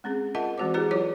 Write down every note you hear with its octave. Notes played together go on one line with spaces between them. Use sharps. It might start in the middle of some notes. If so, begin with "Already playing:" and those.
G#3 C4 C#4 G#4
F4 A#4 D#5 E5 F#5 A5
E3 G#3 C4 F#4 C5 D6
E4 G4 G#4 B4 A#5
F#3 E4 F4 B4 C#5